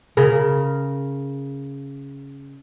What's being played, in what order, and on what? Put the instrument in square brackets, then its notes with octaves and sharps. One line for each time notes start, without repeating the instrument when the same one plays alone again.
[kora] C#3 A#4